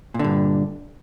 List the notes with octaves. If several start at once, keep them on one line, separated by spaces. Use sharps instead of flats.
G2 A#2 D3